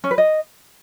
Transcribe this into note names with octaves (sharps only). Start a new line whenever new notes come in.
C#4
B4
D#5